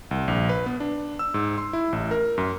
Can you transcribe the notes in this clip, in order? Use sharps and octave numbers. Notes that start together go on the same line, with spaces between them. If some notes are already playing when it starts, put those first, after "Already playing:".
C2
A#1
B4
B3
D4
E6
G#2
C6
E4
A1
A#4
F#2